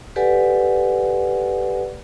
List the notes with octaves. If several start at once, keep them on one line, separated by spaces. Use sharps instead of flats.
G4 A4 B4 D5 F#5 G#5